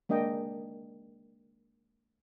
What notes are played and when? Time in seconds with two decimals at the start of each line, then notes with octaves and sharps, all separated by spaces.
0.09 G#3 A#3 D4 D#5 G5